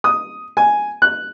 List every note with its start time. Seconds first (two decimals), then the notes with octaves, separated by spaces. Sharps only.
0.04 D#6
0.57 G#5
1.02 F#6